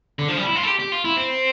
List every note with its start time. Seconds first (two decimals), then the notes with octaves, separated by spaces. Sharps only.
0.19 D3
0.28 F3
0.37 G3
0.47 E4
0.56 F4
0.64 A4
0.68 G4
0.80 G4
0.92 F4
1.05 E4
1.16 C4